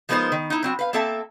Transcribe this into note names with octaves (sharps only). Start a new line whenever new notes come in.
F3 G#3 B3 D#4 A#4 C5
D#3
D#4 E4
F#3 C4 F#4
B4 F5
A#3 C4 A4 E5 A5